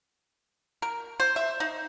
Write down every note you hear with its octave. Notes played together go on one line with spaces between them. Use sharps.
A#4
C5
E5
D#4